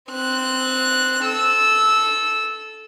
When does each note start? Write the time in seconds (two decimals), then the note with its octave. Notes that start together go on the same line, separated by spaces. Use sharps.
0.11 C4 F#6
1.25 A4 E6